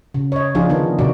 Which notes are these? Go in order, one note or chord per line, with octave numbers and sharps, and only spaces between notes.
C#3
C#5 D#5
F3 D4 D#4 F4 G#4
D3 D#3 B3 D#4
C3 D#3 D#4 F#4 D5